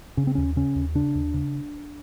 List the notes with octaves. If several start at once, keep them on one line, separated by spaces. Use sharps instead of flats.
C#3 C#4
C4
D#2 C#4
C#3 C#4
D#2
C#3 D4
D#2
C#3